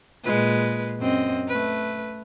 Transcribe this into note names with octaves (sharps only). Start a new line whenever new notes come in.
A#2 G#3 B4
F#2 C4 D#5
A3 B4